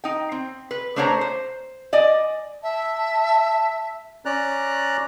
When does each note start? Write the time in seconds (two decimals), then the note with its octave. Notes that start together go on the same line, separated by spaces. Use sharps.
0.04 D#4 G5
0.32 C4
0.71 B4
0.96 A3 D4 C5 C#5 G5 A#5
1.21 C5
1.93 D5 D#5 G#5
2.63 E5 A5
4.25 C#4 D5 A#5 F#6